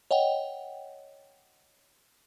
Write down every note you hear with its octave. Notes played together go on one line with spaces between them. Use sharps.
C#5 D#5 F#5 G5